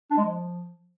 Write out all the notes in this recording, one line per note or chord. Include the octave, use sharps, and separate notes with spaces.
D4
G#3
F3